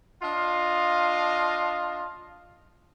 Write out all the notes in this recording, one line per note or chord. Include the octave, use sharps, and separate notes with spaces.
D4 F4 D#5 F5